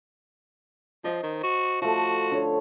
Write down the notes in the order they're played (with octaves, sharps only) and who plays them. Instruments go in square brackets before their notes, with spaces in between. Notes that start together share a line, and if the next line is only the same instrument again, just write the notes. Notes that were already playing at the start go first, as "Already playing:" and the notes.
[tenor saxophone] F3 [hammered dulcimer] C5 D#5
[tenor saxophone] D#3
F#4
[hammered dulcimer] F3 A3 [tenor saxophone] F#4
[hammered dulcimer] D3 C#5